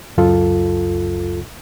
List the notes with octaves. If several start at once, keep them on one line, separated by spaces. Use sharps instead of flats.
C#2 F#2 F#3 F4 A4